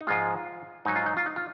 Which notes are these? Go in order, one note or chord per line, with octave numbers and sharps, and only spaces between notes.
D#4
G#2 F3 G#3 F4
G#2 F#3 D#4
F4
D#4
F4
D#4
F4